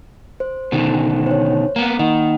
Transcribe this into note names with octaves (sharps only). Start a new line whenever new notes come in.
C5
B2 D3 D#3
C5 C#5
A#3 B3 A#5
D#3 A#3 D#5 F#5